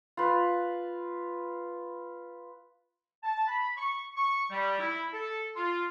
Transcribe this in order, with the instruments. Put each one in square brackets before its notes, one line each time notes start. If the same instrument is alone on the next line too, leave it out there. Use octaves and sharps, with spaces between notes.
[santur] F4 B4
[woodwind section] A5
B5
C#6
C#6
G3
E4
A4
F4